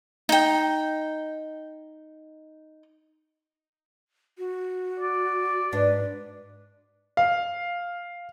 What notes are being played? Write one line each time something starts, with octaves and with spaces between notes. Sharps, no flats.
D#4 G5
F#4
D5
G#2 D4 B4
F5